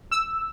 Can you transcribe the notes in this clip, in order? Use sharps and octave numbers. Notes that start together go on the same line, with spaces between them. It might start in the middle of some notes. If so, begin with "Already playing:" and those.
E6